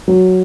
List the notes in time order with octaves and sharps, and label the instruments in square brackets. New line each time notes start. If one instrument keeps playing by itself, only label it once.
[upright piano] F#3